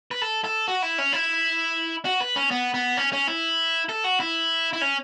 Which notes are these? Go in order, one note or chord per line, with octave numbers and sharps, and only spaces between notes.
B4
A4
A4
F#4
E4
C#4
E4
F#4
B4
C#4
B3
B3
C#4
C#4
E4
A4
F#4
E4
E4
C#4